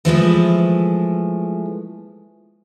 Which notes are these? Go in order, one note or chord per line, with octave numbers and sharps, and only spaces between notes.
E3 F3 G#3 A3